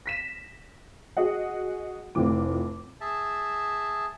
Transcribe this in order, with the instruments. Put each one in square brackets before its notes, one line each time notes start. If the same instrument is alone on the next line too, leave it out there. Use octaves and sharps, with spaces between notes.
[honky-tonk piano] A#6 B6 E7
F#4 G#4 D#5 F#5
F1 A2 E3 F3 D6
[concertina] G#4 E5 A5